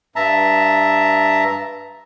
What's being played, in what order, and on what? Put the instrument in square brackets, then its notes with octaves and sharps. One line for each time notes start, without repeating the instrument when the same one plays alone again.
[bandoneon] G2 E5 A5 A#5